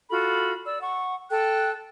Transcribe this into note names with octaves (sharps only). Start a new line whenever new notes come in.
F4 F#4 A4 B5
D5 E6
F#5 C#6
A4 G5 F#6